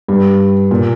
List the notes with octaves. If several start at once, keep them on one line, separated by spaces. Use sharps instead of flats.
G2
A#2